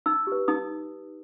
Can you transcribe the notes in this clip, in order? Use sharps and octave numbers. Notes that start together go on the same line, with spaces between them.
D#4 E6
G4 B4
D#4 D#6